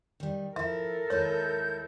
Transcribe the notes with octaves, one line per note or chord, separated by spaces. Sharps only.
D#3 G3
F3 E4 A4 A#4 E5
D#2 G#3 E4 C#5 G6